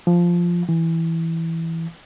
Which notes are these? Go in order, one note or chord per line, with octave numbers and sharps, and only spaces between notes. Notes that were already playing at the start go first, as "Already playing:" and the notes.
F3
E3